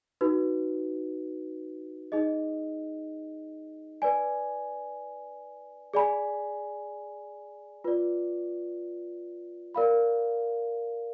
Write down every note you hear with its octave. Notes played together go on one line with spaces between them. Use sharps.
D#4 F#4 B4
D#4 G#4 D#5
B4 D5 G#5
G#4 D5 G#5 B5
F4 B4 D5
A#4 D5 F5 B5